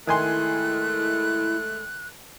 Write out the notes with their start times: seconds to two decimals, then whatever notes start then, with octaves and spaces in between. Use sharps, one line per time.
0.07 D#3 G#3 A3 E4 G#5 C6 F#6